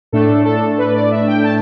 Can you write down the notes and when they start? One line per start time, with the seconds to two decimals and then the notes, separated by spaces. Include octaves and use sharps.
0.12 A2 A3 D4 A4
0.45 A4
0.78 B4
0.95 D5
1.11 E5
1.27 G5
1.44 A5